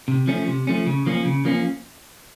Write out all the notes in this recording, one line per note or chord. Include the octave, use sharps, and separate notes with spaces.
C3
F3 A3 C#4
C3
F3 A3 C#4
C#3
F3 A#3 C#4
C#3
F3 A#3 C#4